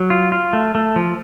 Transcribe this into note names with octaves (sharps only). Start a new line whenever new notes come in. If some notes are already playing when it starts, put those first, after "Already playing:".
Already playing: F#3
F4
F4
A3
A3
F3